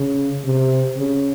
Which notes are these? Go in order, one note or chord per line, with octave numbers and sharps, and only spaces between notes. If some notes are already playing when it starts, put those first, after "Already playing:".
Already playing: C#3
C3
C#3